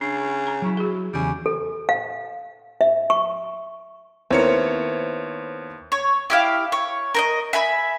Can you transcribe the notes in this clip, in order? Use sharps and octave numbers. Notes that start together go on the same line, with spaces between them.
C#3 D4
A#5
F#3 E4
F#4 G#4
E2 C#3 G3 G#5
A4
F5
E5
C#6
D#2 B3 C4 E4 A#4 C5 C#5 C#7
C#5
E4 G4 F5
C#5
A#4 C5 D#5
E5 G#5 B5